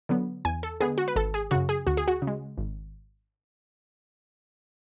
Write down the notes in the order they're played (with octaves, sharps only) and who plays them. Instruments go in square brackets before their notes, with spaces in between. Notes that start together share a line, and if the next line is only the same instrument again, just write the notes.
[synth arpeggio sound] D3 F#3 B3
E2 G#5
A4
D3 G#3 B3 G#4
F#4
B4
G#1 A4
G#4
F#2 C#3 F#4
G#4
D2 F#4
G#4
F#4
C#3
G#3
G#1